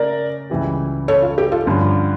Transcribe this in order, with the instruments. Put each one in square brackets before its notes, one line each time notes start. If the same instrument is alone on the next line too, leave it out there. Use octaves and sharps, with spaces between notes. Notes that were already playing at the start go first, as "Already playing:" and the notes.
Already playing: [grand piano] C#3 A3 [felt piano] A#4 D5
[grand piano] C#2 C#3 E3 G3
[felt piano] A4 C#5
F4
G4
F4 A4
[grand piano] G2 D3 F3 C#4 F4